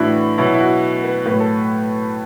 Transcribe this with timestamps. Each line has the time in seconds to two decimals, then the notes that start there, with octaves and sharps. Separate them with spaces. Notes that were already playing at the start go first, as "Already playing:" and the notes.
Already playing: A2 E3 D4 E4 F#4 B4
0.38 B2 F#3 E4
0.54 E4
0.60 F#4
1.04 B4
1.26 A2 F#3 B4
1.40 A4